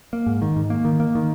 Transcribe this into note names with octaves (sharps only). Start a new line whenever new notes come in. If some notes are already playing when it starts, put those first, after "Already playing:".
A#3
G#2
D#3
G#2
A#3
D#3
A#3
D#3